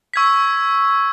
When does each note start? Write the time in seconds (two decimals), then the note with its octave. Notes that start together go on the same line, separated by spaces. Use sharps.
0.14 C#6 E6 G#6 B6